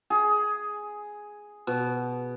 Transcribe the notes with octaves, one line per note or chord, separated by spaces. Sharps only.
G#4
B2